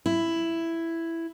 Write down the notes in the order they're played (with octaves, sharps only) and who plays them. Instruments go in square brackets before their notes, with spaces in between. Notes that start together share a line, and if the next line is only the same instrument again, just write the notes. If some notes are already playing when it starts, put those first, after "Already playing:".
[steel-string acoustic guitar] E4